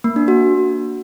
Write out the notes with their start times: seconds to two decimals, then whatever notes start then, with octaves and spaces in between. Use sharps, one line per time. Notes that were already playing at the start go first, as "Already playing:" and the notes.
0.04 A#3
0.16 D4
0.28 F#4